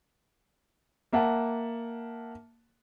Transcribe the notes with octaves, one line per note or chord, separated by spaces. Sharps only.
A#3 E5 F#5 A5